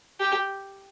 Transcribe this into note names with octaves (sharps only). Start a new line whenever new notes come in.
G4